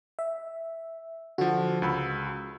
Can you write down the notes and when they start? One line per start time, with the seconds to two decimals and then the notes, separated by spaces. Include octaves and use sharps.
0.19 E5
1.38 D3 F3 F#4
1.82 C#2 B5 E6